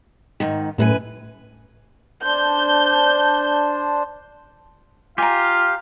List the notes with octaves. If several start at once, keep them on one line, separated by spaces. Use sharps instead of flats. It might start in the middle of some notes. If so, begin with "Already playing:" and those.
G#2 D#3
F#2 A2 B4 G#5
D4 C5 G6
F4 G4 F5 G#5 A#5